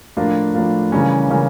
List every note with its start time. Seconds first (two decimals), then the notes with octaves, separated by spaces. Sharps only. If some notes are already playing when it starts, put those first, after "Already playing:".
0.17 A2 F3 A#3 D4 F4
0.54 A2 F3 A#3 D4 F4
0.92 C#3 E3 G3 A#3 C#4
1.30 C#3 E3 G3 A#3 C#4